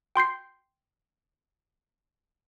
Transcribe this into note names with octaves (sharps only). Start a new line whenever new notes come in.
G5 C6 G6 C7